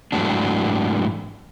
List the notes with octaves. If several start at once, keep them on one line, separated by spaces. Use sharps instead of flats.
G#2 E3 F#3 A3 D4